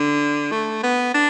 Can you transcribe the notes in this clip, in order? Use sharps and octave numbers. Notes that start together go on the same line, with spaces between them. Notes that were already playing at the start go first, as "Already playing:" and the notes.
Already playing: D3
A3
B3
D4